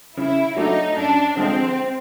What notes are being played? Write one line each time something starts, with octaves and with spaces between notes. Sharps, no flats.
C#3 E4
F#3 A3 D4 D#4
F#2 D4
D3 F3 G#3 C4